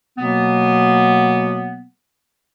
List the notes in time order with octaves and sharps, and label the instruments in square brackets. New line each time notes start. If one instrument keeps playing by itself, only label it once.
[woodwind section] B2 F#3 A#3 B3